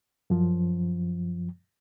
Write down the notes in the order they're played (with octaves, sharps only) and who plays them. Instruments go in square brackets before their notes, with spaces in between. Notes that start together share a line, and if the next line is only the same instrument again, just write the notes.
[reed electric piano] F#2 F3